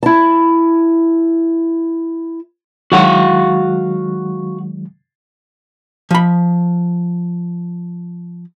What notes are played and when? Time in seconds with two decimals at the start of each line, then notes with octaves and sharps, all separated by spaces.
0.03 E4 A5
2.92 D#3 F#3 G#3 F#4 F5 F#5
6.11 F3 B5